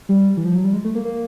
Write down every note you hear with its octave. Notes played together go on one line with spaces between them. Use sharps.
G3
E3
F3
F#3
G3
G#3
A3
A#3
A#3